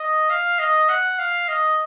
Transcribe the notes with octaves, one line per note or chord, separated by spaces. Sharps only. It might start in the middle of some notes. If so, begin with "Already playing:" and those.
Already playing: D#5
F5
D#5
F#5
F5
D#5